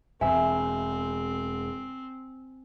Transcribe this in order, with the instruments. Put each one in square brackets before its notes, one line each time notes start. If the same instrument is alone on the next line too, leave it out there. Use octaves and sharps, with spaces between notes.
[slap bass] E1 [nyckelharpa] C4 [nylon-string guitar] E5 [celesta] G#5